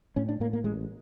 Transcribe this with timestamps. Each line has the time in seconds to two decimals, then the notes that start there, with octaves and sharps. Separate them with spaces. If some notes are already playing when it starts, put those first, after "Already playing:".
0.16 A2 C#4
0.28 D4
0.40 A2 A#3
0.53 A#3
0.64 A1 G#3